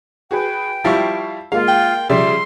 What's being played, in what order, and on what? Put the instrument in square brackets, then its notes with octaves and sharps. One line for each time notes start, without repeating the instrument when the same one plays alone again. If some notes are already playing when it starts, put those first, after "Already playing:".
[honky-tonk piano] F#4 G#4 B4 [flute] G5
[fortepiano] F3 G3 E4 [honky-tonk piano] F5 C#6
[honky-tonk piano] G#3 A#3 [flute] F4 [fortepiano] F5
[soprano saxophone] G5
[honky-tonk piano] C#3 F3 G3 [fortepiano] D5 [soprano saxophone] E5 [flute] C6